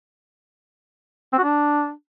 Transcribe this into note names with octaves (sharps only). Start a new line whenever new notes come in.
C4
F#4
D4